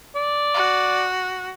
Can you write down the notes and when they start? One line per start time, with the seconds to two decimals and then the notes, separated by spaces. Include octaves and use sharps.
0.15 D5
0.54 F#4